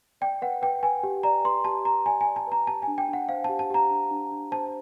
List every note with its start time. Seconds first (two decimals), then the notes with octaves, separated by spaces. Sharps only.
0.21 D5 G5
0.42 B4 F#5
0.62 B4 G5
0.83 B4 G#5
1.03 G4
1.23 D5 A#5
1.45 B4 C6
1.64 G4 A5
1.85 G4 A#5
2.06 D5 G#5
2.21 G#5
2.27 D5
2.36 A5
2.47 B4 A#5
2.67 G4 A5
2.82 G#5
2.87 D4
2.98 G5
3.09 D4 F#5
3.29 C5 F5
3.44 G4 A5
3.59 A5
3.70 G4 A#5
3.90 D4
4.11 D4
4.31 D4
4.52 C5 A5